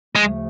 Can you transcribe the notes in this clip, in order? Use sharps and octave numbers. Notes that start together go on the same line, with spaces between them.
D2 C#3 F3 G#3 A3